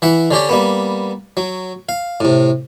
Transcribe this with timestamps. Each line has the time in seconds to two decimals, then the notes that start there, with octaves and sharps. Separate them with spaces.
0.02 E3 E5 F#5
0.31 D3 C#4 G4 D5
0.49 G3 A#3 B3
1.37 F#3
1.89 F5
2.20 A2 C3